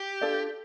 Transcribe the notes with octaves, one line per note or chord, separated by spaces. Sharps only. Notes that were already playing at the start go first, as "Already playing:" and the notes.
Already playing: G4
D4 F4 A4 D5